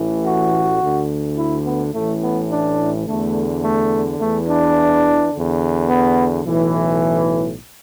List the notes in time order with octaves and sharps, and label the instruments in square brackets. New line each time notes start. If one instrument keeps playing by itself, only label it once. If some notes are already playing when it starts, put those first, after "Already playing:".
Already playing: [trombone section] A1 A2 E3
F#4
D2 D3
E4
B3
A1 A2 E3 A3
B3
D4
E2 D3 A3
A3
E2 E3 A3
D4
E2 D3
B3
B1 A2 E3